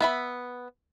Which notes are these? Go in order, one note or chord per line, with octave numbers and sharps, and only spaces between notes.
B3 E5 B5